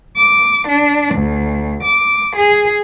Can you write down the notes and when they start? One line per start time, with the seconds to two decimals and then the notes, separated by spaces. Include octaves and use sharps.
0.16 D6
0.68 D4
1.14 D2
1.83 D6
2.36 G#4